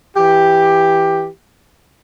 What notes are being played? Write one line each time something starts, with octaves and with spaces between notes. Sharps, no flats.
E3 G4